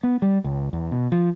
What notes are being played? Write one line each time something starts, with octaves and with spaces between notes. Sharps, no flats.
B3
G3
C#2
E2
B2
F3